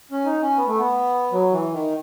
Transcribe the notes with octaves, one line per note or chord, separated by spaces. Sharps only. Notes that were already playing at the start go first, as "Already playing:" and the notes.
C#4
D#4
C#4
B3
A3
B3
F#3
E3
D#3